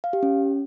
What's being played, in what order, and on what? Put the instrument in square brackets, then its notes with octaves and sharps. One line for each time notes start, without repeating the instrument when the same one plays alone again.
[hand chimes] F5
G4
C#4